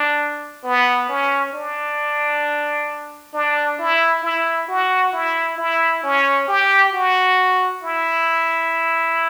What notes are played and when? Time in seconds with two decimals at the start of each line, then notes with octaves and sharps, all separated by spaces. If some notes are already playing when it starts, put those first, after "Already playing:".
Already playing: D4
0.64 B3
1.09 C#4
1.53 D4
3.33 D4
3.79 E4
4.23 E4
4.68 F#4
5.13 E4
5.58 E4
6.03 C#4
6.48 G4
6.93 F#4
7.83 E4